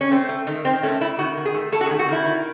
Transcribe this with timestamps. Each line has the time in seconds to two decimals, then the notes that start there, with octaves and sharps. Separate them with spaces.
0.01 C#4
0.11 A3 C4
0.29 A3
0.47 D#3
0.65 D#3 C4
0.83 A3 C#4
1.00 A3 E4
1.19 D#3 F#4
1.37 D#3
1.45 G#4
1.54 A3
1.72 A3 A4
1.81 F#4
1.86 G#4
1.90 D#3
1.99 F#4
2.08 D#3 E4
2.26 D#3